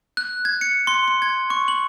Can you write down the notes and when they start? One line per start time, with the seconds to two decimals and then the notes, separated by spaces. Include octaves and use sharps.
0.17 F#6
0.45 G#6
0.61 C#7
0.87 C6
1.08 C6
1.22 G#6
1.50 C#6
1.68 F#7